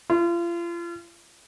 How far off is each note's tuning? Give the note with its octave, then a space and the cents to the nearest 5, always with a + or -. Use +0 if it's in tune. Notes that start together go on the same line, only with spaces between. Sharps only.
F4 -35